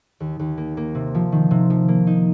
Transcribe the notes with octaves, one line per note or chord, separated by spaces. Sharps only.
D#2
D#2
A#3
A#3
C3
F3
D#3
C3
F3
A#3
D#4